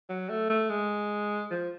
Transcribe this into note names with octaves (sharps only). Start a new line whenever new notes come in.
F#3
A3
A3
G#3
F3